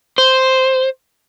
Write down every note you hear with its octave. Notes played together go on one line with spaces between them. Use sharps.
C5